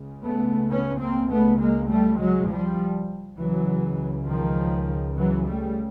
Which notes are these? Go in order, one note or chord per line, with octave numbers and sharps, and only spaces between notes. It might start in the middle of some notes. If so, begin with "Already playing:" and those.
Already playing: C#2 C#3
A3 B3
B3 C#4
A#3 C4
A3 B3
G#3 A#3
G3 A3
F#3 G#3
F3 G3
C#2 C#3 E3 F#3
D#3 F3
E3 F#3
G3 A3